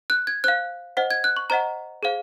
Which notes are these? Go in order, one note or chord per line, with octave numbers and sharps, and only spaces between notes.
F#6
G#6
C5 F5 F#6
C5 D#5 F#5
G#6
F#6
C#6
C5 D#5 F#5 A#5
G#4 C5 F5